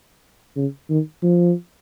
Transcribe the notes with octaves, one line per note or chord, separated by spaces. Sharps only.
C#3
D#3
F3